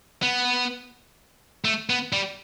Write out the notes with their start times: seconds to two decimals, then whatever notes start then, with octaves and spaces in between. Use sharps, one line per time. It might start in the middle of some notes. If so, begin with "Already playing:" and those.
0.22 B3
1.65 A3
1.90 B3
2.13 G3